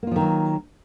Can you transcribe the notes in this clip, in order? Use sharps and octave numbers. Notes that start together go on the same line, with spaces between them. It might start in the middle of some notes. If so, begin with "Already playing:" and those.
D#3 F3 F#3 A#3 F4